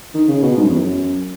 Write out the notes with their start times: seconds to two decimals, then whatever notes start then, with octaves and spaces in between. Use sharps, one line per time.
0.14 D#3
0.28 C#3
0.42 B2
0.57 G#2
0.63 F#2
0.71 E2
0.78 F#2